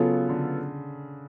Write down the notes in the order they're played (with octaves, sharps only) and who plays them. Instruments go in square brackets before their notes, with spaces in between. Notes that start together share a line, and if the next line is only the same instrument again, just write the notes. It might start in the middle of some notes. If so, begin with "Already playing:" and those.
Already playing: [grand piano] C#3 [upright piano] F#3 B3 F4 A4
[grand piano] D3